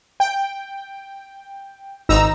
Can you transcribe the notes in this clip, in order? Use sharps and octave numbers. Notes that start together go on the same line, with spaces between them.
G5
G#1 D#4 A#5 E6